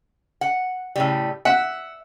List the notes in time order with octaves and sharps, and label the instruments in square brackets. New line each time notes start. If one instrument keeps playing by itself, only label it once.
[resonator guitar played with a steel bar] F#5
A2 C#3 G3
[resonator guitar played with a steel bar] E5 [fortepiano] F#5